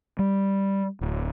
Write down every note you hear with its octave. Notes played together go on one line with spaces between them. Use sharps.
G3
D1